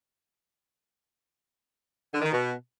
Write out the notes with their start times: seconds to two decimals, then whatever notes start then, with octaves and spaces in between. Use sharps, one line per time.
2.12 D3
2.22 D#3
2.32 B2